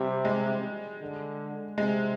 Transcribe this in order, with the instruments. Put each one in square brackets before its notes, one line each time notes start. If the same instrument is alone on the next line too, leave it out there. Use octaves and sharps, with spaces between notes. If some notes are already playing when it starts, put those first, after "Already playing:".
Already playing: [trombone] C3 [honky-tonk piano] G3
[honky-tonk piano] G#3
[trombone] D3
[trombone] C3 [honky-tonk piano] G#3